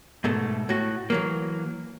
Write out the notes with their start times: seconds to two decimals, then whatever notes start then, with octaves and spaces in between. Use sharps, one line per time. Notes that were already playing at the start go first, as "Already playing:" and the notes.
0.24 G#2 B2 A3
0.69 A2 F#4
1.10 E3 F#3 A#3